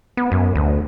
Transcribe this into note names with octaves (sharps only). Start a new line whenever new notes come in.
B3
F#2
D2